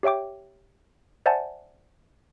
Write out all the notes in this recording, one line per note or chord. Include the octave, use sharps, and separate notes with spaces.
G4 C#5 E5 G5 D6
C5 D5 E5 F#5 G#5 A5